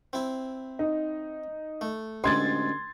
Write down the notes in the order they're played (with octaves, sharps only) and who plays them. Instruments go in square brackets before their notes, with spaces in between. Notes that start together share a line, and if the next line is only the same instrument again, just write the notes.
[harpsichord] C4 E4
[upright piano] D#4
[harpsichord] A3
[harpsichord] A1 D2 G#3 [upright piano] C6 G#6 A6